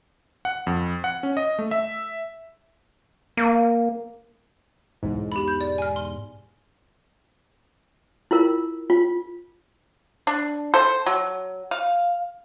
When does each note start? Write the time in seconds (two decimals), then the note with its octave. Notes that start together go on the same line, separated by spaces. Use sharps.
0.45 F#5
0.67 F2
1.04 F#5
1.23 C#4
1.37 D#5
1.59 A3
1.71 E5
3.37 A#3
5.03 B1 E2 G#2
5.32 G4 B5
5.48 G6
5.61 D5
5.78 G#5 F6
5.96 C6
8.31 E4 F4 A#4
8.90 F4
10.27 D4
10.74 A4 C5
11.06 F#3
11.71 F5